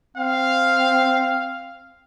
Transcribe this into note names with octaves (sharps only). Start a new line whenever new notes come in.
C4 F5